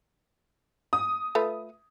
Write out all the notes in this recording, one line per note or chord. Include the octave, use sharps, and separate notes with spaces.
D#6
A3 F4 B4